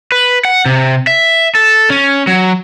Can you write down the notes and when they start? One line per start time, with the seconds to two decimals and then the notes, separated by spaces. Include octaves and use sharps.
0.12 B4
0.45 F#5
0.66 C3
1.07 E5
1.55 A4
1.90 C#4
2.27 F#3